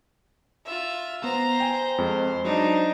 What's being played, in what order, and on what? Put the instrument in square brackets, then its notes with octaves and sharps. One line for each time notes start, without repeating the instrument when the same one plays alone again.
[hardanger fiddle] F4 E5
[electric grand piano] B3 [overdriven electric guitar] C5 [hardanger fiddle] A#5
[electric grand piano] G5 G#5
F2 G#3
[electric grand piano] F#3 [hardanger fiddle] D4 D#4